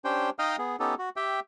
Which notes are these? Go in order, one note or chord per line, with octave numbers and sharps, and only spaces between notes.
C#4 D4 G4 C5 G5
D#4 D#5 F5 G5 D#6 F6
B3 G#4
B3 C#4 D#4 G4 A4
F#4
G4 E5 G5